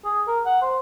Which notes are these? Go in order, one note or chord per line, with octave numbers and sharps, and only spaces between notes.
G#4
A#4
F#5
C5